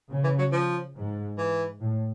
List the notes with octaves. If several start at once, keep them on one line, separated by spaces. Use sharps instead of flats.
C#3
E3
F#3
F3
G#2
E3
A2